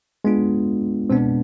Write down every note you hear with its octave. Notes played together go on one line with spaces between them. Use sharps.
G#3 B3 D4 F4
B2 G#3 B3 C4 D4